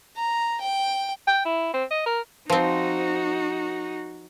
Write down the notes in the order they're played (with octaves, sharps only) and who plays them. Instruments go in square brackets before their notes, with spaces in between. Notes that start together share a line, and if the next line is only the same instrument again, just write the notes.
[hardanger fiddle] A#5
G5
[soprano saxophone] G5
E4
C4
D#5
A#4
[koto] F3 C4 [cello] D#4 F#4